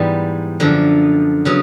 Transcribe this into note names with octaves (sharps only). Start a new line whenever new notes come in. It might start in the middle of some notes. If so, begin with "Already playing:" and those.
Already playing: G#2 E3 G3 B3
F#2 D3 F3
C#3 F#3 B3